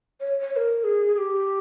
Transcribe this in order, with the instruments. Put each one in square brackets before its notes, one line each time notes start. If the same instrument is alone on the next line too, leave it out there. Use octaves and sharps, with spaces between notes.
[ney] C#5
C#5
C#5
A#4
G#4
G#4
G4